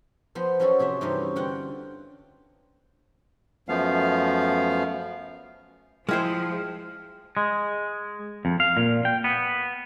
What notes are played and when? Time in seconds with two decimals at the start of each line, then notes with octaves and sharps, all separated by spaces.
0.35 F3 B3 C5
0.60 F3 F#3 C#4 F#4 G#4 A4
0.79 C3 G#4 C5 E5
1.01 G2 C3 E3 C#4 D#4 C5
1.36 D3 F4 F#5 G5
3.69 F#2 F3 A3 B3 F5
6.09 F3 G#3 E4 C5 G5 F6
7.37 G#3
8.45 F2
8.60 F5
8.77 A#2
9.05 G5
9.24 B3